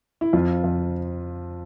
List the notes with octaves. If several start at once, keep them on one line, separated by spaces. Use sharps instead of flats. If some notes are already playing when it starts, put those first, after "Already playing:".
E4
F2 F4
F2